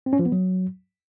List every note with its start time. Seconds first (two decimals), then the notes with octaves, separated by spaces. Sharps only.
0.06 C4
0.13 C#4
0.19 F3
0.26 B3
0.32 F#3